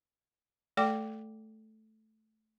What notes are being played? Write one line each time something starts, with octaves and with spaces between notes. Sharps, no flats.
A3 A4 D5 G5 D6